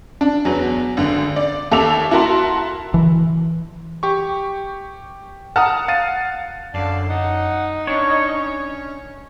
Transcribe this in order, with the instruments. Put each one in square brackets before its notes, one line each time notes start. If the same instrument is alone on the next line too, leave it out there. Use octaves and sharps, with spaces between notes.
[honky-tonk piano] D4
E2 F#3 B3
G#1 D3
D5
D#2 A4 E5 D6 F7
E4 F#4 A#4 A5 C6
[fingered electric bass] E3
[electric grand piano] G4 C#6
[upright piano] F#5 F6 [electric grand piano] A5 A#5 D#6
[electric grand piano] F5 A6 D#7
[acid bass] F#2 [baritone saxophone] D3 [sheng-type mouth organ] D5 F5 A5
[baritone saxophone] D#4 [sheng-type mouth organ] F#5
[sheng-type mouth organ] C#4 [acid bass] D4 [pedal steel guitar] C#5